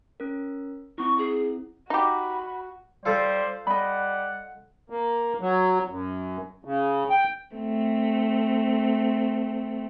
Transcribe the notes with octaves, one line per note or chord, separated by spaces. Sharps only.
C#4 A#4
C4 E4 C#6
G#4
D#4 F#4 G4 B5
G3 F4 A4 C5
G3 D#5 F#5 B5
A#3
F#3
F#2
C#3
G5
A3 C4